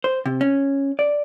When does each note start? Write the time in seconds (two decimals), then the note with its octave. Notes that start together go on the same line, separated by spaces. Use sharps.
0.04 C5
0.26 C3
0.41 C#4
0.99 D5